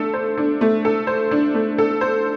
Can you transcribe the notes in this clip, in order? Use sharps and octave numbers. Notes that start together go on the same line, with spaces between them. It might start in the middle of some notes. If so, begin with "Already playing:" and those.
Already playing: A3 D4 A4
C5
D4
A3
A4
C5
D4
A3
A4
C5